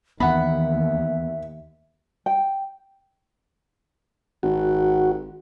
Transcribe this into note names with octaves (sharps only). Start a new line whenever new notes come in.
D#2 E3 B3 E5 F#5 B5
G5
G#1 F#4